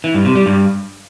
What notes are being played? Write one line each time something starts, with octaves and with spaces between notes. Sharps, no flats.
E3
G2
C3
G3
G2